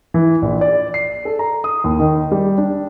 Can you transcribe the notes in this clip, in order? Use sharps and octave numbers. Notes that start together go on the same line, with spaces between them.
E3
A#1
D5
C7
A4
A#5
D#6
D#2
D#3
G3
D4